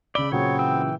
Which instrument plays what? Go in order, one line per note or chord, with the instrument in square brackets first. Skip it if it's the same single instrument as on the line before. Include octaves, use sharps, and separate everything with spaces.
[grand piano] C#3 G7 [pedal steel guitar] D5 [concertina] B5 E6
[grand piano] A#2 C#3 F#3 [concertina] B3 C4 [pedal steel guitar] C#5
[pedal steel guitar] E3 G5 E6